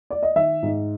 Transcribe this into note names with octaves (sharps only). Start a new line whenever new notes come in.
D5
D#5
D#3 E5
G#2